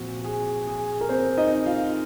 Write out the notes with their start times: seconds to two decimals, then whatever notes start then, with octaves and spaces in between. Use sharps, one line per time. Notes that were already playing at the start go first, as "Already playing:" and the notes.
Already playing: A#2 F3 C4 F#4
0.24 G#4
0.67 G#4
1.01 A#4
1.09 C4 C5
1.37 D#4 D#5
1.66 F4 F5